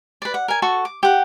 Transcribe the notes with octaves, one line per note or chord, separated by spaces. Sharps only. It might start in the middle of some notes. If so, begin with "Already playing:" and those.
B4 D5
F#5
A#4 G#5
F#4 A4 C#6
D6
G4 F#5